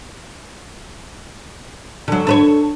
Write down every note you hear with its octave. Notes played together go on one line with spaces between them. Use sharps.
D3 F#3
A4 B4 C#5